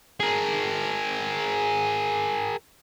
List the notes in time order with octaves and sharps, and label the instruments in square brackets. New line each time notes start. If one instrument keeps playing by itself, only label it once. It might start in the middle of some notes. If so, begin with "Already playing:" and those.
[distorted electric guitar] G#4 A#4